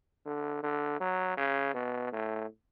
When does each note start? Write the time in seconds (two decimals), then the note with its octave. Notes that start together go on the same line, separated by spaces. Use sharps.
0.26 D3
0.63 D3
1.01 F#3
1.37 C#3
1.74 B2
2.12 A2